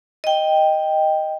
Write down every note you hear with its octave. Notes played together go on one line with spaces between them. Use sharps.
D#5 G5